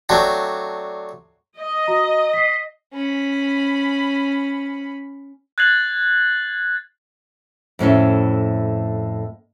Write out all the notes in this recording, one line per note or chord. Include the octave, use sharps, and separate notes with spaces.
F#3 A3 C4 D4
D#5
F#4 A#5
B6 C7
C#4 B5
F#6 G#6 A6 C7 F#7
F2 A2 C#4 E4